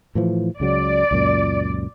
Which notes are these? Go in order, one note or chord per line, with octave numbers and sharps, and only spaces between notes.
A2 E3 F3
C#2 C#3 F#3 D5
C#2 F#2 A#2